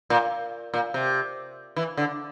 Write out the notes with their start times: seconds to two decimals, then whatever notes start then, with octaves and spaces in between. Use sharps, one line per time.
0.10 A#2
0.74 A#2
0.94 C3
1.76 E3
1.97 D3